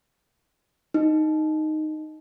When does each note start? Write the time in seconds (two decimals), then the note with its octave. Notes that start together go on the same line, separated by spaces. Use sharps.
0.94 D#4